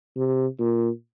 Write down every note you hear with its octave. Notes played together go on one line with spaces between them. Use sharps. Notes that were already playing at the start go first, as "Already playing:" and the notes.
C3
A#2